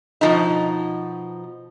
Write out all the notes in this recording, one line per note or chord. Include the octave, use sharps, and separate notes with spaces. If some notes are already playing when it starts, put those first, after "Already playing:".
B2 F3 D#4